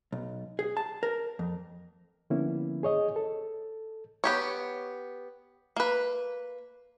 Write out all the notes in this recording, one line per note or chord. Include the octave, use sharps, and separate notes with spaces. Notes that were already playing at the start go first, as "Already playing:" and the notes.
B1
G#4
A5
A#4
F2
D3 F3 A#3 B3 C#4 E4
G#4 C#5 D#5
A4
B3 G4 C#5
A#3 B4